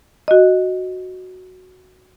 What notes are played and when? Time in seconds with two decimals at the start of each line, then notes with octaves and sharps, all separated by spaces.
0.28 F#4 D#5